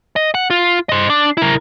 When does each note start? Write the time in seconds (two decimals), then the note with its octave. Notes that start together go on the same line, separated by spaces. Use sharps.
0.16 D#5
0.34 F#5
0.50 F4
0.89 C5 D#5
1.10 D4
1.37 E4 A#4